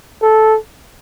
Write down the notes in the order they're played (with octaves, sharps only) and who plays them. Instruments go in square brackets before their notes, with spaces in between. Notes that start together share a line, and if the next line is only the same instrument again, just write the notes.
[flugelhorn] A4